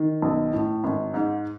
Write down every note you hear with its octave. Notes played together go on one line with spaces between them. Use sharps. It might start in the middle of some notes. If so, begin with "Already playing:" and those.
Already playing: D#3
B1
A2
G#1
G#2